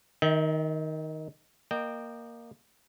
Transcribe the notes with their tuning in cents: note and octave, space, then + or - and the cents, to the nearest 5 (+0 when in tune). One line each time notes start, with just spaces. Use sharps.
D#3 +5 E5 -45 G5 +0
A#3 +0 D#5 -25 G5 +0